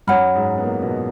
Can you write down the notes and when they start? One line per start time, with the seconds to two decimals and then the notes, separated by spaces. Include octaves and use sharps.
0.07 F#2 F#3 C#5 F#5 B5 F6
0.35 G#2 G#3
0.58 B3
0.63 A#2 A#3
0.82 B2 B3